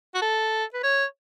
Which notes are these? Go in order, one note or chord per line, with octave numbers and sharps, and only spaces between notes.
F#4
A4
B4
C#5